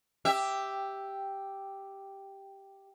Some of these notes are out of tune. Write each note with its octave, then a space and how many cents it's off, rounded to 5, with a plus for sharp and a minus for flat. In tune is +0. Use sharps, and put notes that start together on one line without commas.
G4 +0 E5 +0